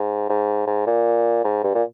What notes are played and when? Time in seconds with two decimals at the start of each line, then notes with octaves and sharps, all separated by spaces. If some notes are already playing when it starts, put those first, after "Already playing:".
Already playing: G#2
0.29 G#2
0.67 G#2
0.87 A#2
1.44 G#2
1.63 G2
1.75 A#2